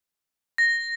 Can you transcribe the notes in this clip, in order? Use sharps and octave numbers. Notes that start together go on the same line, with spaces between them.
A#6